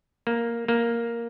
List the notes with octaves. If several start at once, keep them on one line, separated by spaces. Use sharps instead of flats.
A#3
A#3